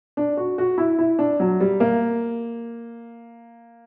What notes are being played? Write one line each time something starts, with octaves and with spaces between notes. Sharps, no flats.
D4
F#4
F#4
E4
E4
D4
F#3
G3
A#3